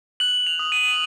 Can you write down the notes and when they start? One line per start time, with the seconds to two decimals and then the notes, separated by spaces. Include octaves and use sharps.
0.20 F#6 F#7
0.47 F7
0.59 D#6
0.72 D#7